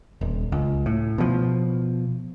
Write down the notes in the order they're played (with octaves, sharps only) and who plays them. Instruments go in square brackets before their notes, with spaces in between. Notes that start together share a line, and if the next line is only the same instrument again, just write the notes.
[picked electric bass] D#1
C#2
A2
B2 F3